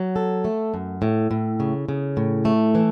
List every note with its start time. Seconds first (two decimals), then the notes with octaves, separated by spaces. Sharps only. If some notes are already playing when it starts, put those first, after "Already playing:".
Already playing: F#3
0.16 A4
0.45 A3
0.74 F#2
1.02 A2
1.31 A2
1.60 C#3
1.89 C#3
2.17 A2
2.45 A3
2.75 E3